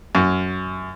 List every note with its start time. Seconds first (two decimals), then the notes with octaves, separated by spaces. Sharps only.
0.15 F#2